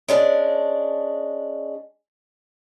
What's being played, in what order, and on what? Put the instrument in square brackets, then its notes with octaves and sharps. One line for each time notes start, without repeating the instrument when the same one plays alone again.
[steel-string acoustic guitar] G#3 C#4 D4